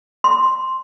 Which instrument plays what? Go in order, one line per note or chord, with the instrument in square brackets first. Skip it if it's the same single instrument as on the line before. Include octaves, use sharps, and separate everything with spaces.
[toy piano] C6